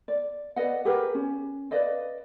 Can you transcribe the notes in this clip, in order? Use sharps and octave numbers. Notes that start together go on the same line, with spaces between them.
D5
B4 D5 D#5 F#5
G4 G#4 A#4 B4
C#4
B4 D5 D#5 F5